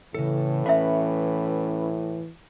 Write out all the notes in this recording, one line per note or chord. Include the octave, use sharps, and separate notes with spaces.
A2 C#3 E3 A4
C#4 B4 E5 F5